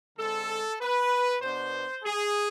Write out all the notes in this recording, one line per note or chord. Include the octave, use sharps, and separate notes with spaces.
D3 G#3 C4 A4
B4
B2 B3 D4 C5
G#4